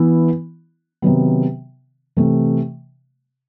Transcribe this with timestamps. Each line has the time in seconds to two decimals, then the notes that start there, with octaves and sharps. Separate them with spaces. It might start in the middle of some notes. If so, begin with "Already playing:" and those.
Already playing: E3 B3 E4
1.02 C3 D#3 F#3 B3
2.17 C3 E3 A3